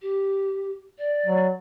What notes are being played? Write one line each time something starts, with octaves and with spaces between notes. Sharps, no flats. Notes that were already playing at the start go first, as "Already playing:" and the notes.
G4
D5
F#3